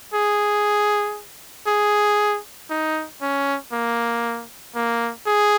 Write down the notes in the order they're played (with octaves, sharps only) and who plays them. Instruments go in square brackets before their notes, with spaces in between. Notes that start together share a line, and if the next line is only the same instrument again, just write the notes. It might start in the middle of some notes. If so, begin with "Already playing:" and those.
[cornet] G#4
G#4
D#4
C#4
A#3
A#3
G#4